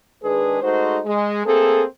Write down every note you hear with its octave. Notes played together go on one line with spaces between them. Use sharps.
D#3 G#3 D4 G#4 B4
G#3 A3 D#4 F#4 C5
G#3
A3 A#3 C4 G#4 A4